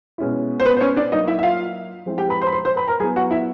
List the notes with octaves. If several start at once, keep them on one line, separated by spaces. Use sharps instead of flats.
B2 G#3 C#4 E4
C5
B3 B4
C5
C#4 C#5
D4 D5
F#3 A#3 D#4 D#5
E4 E5
E5
F4 F5
F3 G#3 C4 E4
G4 G5
B4 B5
C5 C6
B5
C5 C6
C5 C6
B4 B5
A#4 A#5
F#3 B3 E4 G#4 G#5
F#4 F#5
E4 E5